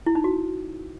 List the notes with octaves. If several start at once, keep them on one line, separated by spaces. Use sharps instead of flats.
E4
D#4
F#4